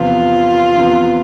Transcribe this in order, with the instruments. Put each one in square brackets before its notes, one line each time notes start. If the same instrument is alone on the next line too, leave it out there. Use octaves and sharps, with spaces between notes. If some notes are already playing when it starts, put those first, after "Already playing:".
Already playing: [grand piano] E2 C3 F3 B3 [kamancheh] F4
[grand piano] E2 C3 F3 B3